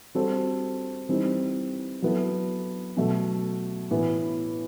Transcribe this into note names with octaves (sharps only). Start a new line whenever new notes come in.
G3 C4 F#4 A4 C5
E3 G3 C4 D#4
F#3 B3 E4 A4
B2 F#3 A3
A2 E3 B3 E4